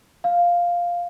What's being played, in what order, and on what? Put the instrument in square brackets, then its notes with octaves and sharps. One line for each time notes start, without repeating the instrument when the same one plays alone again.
[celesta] F5